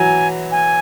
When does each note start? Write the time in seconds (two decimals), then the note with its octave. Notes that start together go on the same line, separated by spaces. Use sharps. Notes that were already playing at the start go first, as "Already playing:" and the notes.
Already playing: E3 F#3 G#5
0.52 G#5